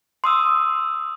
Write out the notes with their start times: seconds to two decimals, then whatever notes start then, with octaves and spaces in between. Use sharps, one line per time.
0.24 C6 D#6 E6